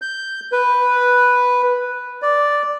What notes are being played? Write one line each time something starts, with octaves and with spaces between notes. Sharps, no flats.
G6
B4
D5